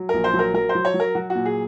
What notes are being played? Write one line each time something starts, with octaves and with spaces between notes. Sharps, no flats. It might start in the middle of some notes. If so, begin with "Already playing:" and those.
Already playing: F#3
A#1 A#4
C5
F#3
A#4
F#3 A#4
C5
F#3
C#5
F#3
A#4
F#3 F#4
F#4
A#2
G#4